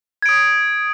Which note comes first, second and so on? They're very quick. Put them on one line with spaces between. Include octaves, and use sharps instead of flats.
G#6 D7 D#6